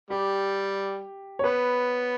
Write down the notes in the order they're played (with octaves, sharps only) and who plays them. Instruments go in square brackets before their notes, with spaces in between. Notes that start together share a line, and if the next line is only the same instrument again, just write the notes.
[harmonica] G3 [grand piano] G4
[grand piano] C#5
[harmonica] B3 [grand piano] B4